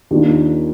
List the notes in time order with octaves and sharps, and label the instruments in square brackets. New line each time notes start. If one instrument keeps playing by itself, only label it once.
[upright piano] D#2 D#3 A#3 D4 F4